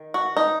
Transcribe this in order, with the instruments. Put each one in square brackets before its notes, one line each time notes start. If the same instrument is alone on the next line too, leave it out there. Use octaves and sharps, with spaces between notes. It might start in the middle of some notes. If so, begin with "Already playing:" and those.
Already playing: [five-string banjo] D#3
F#4
D#4